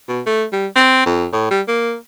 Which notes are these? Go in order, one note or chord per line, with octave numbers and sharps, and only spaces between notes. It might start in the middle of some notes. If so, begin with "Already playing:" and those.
B2
A3
G3
C4
F2
A2
G3
A#3